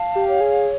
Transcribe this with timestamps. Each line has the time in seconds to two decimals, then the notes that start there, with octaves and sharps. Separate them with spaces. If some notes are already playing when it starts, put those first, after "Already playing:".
Already playing: F5 A5
0.15 G4
0.28 C#5
0.41 G#4